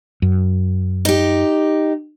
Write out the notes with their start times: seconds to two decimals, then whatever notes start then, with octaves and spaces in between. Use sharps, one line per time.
0.22 F#2
1.05 D#4 G4